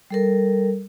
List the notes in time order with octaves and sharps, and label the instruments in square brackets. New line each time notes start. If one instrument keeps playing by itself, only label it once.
[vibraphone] G3 A4 A#4